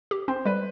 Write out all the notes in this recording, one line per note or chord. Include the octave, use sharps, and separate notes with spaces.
G4
C4 C5
G3 B4